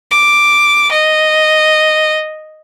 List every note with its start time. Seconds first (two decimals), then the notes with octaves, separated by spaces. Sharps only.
0.11 D6
0.92 D#5